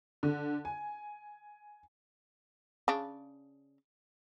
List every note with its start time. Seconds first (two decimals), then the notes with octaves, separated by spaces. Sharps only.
0.23 D3
0.65 G#5
2.88 C#3 D4